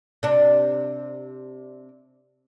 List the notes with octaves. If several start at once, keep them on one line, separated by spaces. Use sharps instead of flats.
C3 D4